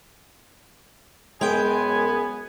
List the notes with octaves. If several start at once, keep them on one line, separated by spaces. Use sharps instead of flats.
F#2 G#3 B3 G5 G#5